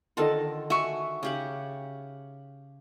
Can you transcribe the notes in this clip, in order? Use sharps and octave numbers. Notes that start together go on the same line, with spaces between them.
D3 D#3 F4 A4 D#5 A5
F#4 E5 G#5 C#6
C#3 G4 F#5